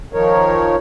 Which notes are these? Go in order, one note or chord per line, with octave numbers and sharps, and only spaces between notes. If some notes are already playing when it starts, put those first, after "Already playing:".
D#3 F3 D#4 A#4 C#5